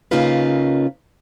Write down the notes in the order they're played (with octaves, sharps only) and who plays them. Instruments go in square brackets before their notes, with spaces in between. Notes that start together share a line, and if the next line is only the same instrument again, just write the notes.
[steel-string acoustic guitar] C#3 A#3 C#4 D#4 F4 B4